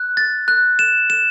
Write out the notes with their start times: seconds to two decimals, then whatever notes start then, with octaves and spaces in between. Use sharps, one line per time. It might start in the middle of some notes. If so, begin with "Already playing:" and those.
Already playing: F#6
0.17 A6
0.48 F#6
0.79 E7
1.10 E7